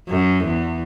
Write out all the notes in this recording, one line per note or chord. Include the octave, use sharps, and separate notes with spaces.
F#2
E2